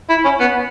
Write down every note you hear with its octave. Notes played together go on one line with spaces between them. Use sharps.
E4
C#4
B3